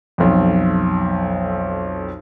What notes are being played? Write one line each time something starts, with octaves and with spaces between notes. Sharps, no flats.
B1 F2